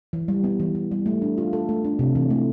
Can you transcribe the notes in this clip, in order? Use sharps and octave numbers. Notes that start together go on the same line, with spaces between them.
E3
G3
B3
E3
E3
G3
A3
D4
F4
A4
A3
D4
C3
E3
A3